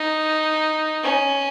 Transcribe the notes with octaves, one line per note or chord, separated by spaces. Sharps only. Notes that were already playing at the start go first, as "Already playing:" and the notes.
Already playing: D#4
C#4